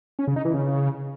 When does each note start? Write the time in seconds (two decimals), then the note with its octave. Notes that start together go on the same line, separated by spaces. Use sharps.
0.19 C#4
0.27 C#3
0.36 D#4
0.45 E3
0.54 C#3